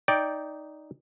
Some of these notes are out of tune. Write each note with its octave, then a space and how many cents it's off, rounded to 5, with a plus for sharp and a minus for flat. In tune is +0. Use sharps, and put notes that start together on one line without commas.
D#4 +0 D5 -15 G5 +0